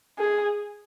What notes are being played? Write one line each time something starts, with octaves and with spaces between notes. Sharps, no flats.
G#4